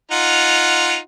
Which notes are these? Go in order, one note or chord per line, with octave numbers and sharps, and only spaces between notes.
D#4 F4 F#5